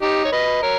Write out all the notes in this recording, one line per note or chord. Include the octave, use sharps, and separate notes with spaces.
D#4 G4
C#5
B4 D#5
A#4 C#5